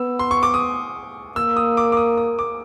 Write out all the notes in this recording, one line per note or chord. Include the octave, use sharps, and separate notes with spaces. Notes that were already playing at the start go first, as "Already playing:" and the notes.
Already playing: B3 E6
C6
C#6
D6
D#6
A#3 E6
D#6
D6
D6
D#6
D#6
D6